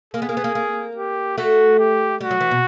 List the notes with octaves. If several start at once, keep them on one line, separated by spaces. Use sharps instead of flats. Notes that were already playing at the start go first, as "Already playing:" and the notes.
A#3 G#4
B3
A#3
B3
A#3
A#3
G4
A3 F#4
G4
G3 F#4
F#3
E3
B2